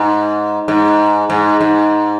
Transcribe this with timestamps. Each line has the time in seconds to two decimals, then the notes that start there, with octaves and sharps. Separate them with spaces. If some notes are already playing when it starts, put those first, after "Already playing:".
Already playing: G#2
0.68 G#2
1.30 G#2
1.61 G#2